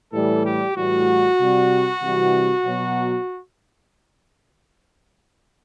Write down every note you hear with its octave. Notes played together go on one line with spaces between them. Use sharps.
A2 E3 G3 A4
G4
A2 E3 G3 F#4
C3 G3
C3 E3 G3
B2 F#3